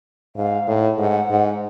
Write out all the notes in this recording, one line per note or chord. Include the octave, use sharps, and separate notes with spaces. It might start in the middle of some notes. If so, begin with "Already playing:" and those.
G#2 F5
A2
G#2 F#5
G#2